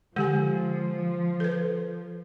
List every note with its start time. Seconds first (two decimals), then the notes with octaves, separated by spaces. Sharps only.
0.16 D3 F3 G#3 G4 G#5
1.40 A4 B4